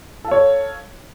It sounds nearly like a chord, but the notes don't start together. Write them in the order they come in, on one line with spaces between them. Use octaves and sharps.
A4 F5 C#5